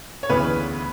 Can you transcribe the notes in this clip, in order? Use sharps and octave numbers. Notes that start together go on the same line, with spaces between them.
C#5
D2 C#3 E3 B3 B4